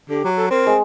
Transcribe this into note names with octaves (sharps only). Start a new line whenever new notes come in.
D3 G4
F#3
A4
C4 A#4
G#3